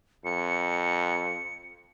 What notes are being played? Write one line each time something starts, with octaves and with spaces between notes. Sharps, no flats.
F2 C#7